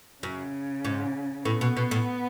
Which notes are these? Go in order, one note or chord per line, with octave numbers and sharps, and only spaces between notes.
F#2 C#3
G#2
A2 B3
B2
B2
A2